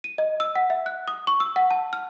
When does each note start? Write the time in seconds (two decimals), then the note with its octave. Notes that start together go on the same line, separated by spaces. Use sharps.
0.04 D#7
0.18 D#5
0.40 E6
0.55 F#5
0.70 E5
0.86 F#6
1.08 D#6
1.27 C#6
1.40 E6
1.56 F#5
1.71 A5
1.93 F6